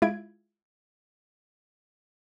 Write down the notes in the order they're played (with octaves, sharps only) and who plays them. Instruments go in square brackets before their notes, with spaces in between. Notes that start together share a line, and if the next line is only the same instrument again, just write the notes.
[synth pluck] G#3 E4 F4 B5 G#6 D7